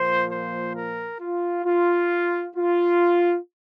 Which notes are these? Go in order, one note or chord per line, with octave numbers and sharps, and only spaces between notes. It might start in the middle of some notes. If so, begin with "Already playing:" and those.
Already playing: A#2 F3 A#3 C5
C5
A#4
F4
F4
F4